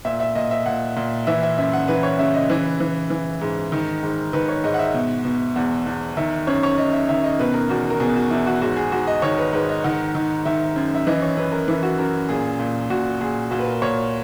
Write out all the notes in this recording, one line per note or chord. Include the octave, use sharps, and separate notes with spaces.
A#2 E5
E5
A#2 D#5
E5
A#2 F#5
A#2
E3 E5
E5
F#2 E5
F#5
E3 B4
C#5
C#3 E5
D#5
E3 B4
E3
E3
G#2
D#3
G#2
D#3 B4
C#5
G#2 D#5
F#5
E5
B2
B2
E2 F#5
E2
D#3 E5
F#2 C#5
C#5
F#2 D#5
E5
D#3 E5
D#5
B2 B4
A#4
E2 F#4
A#4
B2 G#4
F#4
E2 E4
F#4
G#2 F#4
G#4
G#2 F#4
D#5
D#3 C#5
B4
G#2 B4
D#5
D#3 F#5
D#3
D#3 E5
F#2
E5
E3 D#5
C#5
F#2 B4
A#4
E3 E4
F#4
F#2 A#4
A#2 G#4
A#2
A#2 F#4
A#2 G#4
A#2 F#4
B4
A#4
A#2 C#5